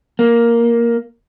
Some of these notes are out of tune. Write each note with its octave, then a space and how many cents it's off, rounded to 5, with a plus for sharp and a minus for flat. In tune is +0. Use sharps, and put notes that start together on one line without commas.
A#3 +5